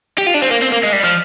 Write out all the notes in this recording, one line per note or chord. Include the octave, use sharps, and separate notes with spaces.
G4
F4
D4
C4
A#3
C4
A#3
G#3
G3
F3